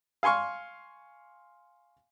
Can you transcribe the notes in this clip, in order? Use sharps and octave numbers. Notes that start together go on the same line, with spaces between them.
F5 G#5 C6 C#6 F6